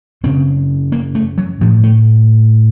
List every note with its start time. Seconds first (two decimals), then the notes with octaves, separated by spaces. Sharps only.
0.24 F#2 C#3 C4
0.92 A#3
1.15 A3
1.38 F#3
1.61 A2 F3
1.84 A3